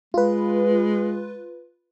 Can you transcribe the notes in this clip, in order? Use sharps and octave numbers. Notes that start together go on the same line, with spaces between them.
G#3 F4 B4